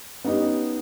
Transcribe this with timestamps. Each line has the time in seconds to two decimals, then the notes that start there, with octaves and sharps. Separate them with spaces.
0.24 B3 C#4 D#4 G4 D#5